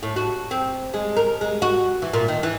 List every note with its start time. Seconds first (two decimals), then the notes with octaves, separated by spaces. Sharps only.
0.03 A2
0.16 F#4
0.51 C4
0.94 G#3
1.17 A#4
1.41 G#3
1.62 F#4
2.02 E3
2.13 A#2
2.28 D#3
2.43 E3